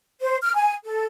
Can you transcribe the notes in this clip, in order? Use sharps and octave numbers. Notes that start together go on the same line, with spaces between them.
C5
F6
G#5
A4